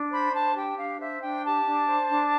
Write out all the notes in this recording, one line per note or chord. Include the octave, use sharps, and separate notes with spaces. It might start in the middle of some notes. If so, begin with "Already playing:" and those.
Already playing: D4
C5 B5
D4 A5
G4 G5
D4 F5
C5 E5
D4 G5
G4 A5
D4
C5
D4